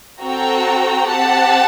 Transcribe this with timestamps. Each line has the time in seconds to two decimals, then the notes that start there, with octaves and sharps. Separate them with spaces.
0.20 C4 F#4 A4 G5 A#5
1.07 C4 G4 F#5 A5